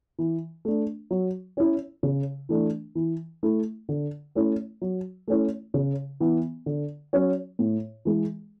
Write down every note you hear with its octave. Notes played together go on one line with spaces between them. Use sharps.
E3
A3 D4
F#3
C#4 E4
C#3
E3 A3 D4
E3
A3 E4
D3
A3 C#4 E4
F#3
A3 C#4 E4
C#3
E3 B3
D3
F#3 C#4
A2
E3 G#3